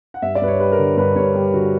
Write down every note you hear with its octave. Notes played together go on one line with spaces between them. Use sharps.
F#5
G2 E5
D5
G2 B4
C#5
G3 B4
A#4
D3
G2 B4
G2 C#5
G3 G4
D3 F#4